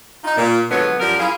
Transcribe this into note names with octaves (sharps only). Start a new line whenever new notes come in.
D#4 F4
A#2
F2 D3 F#3 G#3 B3 C#5
F#2 F3 G3 F#4 A#4
E4 F4 G#4